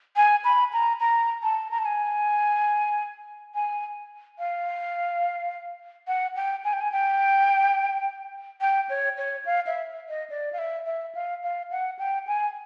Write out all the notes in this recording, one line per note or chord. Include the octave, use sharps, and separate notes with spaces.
G#5
B5
A#5
A#5
A5
A#5
A5
G#5
G#5
F5
F#5
G5
G#5
G5
G#5
G5
G5
C#5
C#5
F5
E5
D#5
D5
F5
E5
E5
F5
F5
F#5
G5
G#5